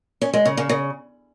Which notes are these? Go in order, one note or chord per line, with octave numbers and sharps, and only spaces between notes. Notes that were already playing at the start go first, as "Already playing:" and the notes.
C#4
G#3
C#3
C#3
C#3